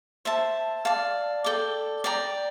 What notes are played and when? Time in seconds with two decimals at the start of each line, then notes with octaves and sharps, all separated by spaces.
0.25 C5 E5 A5
0.85 D5 F5 A5
1.44 A4 D5 G5 D6
2.04 D5 G5 A#5